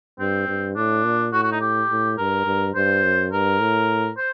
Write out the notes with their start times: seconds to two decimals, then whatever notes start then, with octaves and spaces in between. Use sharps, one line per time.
0.19 G2 C4
0.48 G2
0.76 A2 D4
1.04 A#2
1.32 A2 F#4
1.43 F#4
1.52 D#4
1.61 G4
1.90 A2
2.18 G2 A#4
2.46 G2
2.74 G2 C5
3.03 F#2
3.32 G2 A#4
3.60 A2
4.17 C5